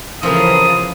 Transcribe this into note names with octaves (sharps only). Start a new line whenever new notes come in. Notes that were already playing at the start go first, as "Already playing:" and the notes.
C#3 E3 F3 F4 A4 A#4 D#6